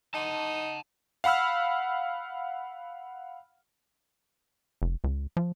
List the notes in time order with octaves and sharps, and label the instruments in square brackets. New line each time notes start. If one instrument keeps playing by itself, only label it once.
[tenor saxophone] D#4 [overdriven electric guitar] F#5 A5
[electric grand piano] F5 F#5 B5 E6 F6
[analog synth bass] F1
C#2
F3